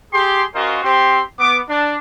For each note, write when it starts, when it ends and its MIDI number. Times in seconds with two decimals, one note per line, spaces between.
0.13 0.44 67
0.13 0.44 68
0.13 0.44 84
0.55 0.80 61
0.55 0.80 65
0.55 0.80 66
0.55 0.80 70
0.55 0.80 72
0.55 0.80 75
0.83 1.22 60
0.83 1.22 67
0.83 1.22 84
1.38 1.59 59
1.38 1.59 86
1.69 1.97 62